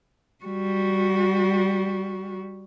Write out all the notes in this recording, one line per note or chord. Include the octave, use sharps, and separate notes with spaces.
G3 F#4